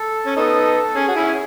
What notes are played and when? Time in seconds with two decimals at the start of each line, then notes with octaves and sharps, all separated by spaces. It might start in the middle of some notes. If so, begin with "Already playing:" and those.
Already playing: A4
0.26 C#4
0.36 B3 D#4 A4
0.95 C#4 G#4
1.08 F#4
1.15 C#4 E4